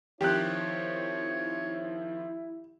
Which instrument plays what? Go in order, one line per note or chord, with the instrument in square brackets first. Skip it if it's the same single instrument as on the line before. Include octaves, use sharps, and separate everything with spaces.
[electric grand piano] D#3 F3 C4 [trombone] E4 [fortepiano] G4 F#6 [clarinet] C#5